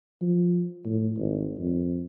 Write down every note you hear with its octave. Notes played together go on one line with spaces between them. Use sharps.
F3
A2
G#1
F2